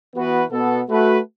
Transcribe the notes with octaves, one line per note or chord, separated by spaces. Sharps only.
E3 B3 F#4 B4
B2 B3 A4
A3 F#4 B4